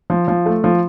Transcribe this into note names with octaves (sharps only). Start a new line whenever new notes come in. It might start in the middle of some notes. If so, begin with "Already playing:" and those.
F3
F3
A3
F3